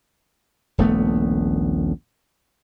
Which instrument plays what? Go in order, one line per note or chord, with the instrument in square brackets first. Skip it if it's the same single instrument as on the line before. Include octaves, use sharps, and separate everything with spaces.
[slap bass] D#1 A#1 A3 B3